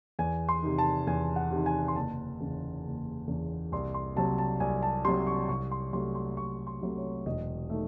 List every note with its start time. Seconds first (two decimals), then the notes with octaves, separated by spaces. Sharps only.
0.19 E2 G#5
0.49 C6
0.62 C3 D#3
0.78 A5
1.07 E2 G#5
1.36 F#5
1.51 C3 D#3
1.66 G#5
1.88 C6
1.95 F#1 A5
2.40 E2 C#3
2.84 F#1
3.28 E2 C#3
3.72 C2 C6
3.94 C6
4.16 C3 F#3 A5
4.38 A5
4.60 C2 G#5
4.83 A5
5.05 C3 F#3 C6
5.27 C#6
5.49 C2 C#6
5.71 C6
5.93 C3 F#3 A3 C6
6.15 C6
6.37 C2 C#6
6.67 C6
6.81 C3 F#3 A3
6.97 C#5
7.26 E1 D#5
7.70 D#3 A3